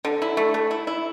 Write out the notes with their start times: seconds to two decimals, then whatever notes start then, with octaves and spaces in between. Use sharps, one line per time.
0.05 D3
0.22 E4
0.37 A3
0.54 A3
0.71 E4
0.87 E4